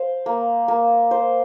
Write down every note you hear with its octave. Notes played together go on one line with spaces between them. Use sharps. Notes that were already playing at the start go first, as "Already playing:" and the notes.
Already playing: C5 F5
A#3
A#3
C5